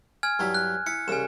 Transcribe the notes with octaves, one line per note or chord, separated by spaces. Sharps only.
G#5 F6 G#6
G2 F#3 E4
F#6
E4 C#7
C2 C#3 G#5 E7